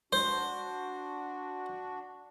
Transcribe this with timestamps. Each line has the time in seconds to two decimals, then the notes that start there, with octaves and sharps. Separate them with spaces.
0.13 D4 F#4 C5